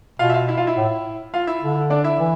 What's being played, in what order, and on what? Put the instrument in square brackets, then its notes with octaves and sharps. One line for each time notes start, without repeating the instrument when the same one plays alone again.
[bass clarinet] B2 [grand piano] F4 F5
[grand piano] E5
F4 F5
E4 E5
F4 F5
E4 E5
[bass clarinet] A2
[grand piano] F4 F5
E4 E5
[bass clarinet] D3
[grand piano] D4 D5
E4 E5
[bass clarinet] E3